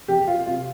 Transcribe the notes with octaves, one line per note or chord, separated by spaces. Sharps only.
F2 G4
F4
C3 F4